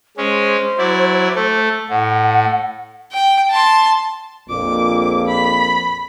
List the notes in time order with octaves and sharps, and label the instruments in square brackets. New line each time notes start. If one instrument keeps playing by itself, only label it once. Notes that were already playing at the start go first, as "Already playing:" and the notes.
[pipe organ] G#3 C#4 [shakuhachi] C5
[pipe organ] F#3 E4 D5
A3 A4
[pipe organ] A2 [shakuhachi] F#5
[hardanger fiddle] G5
A5 C6
[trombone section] A#1 F2 A#2 [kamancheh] D6
[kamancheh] B5